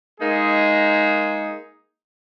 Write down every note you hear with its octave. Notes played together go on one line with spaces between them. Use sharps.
G#3 A#3 D#4 G#4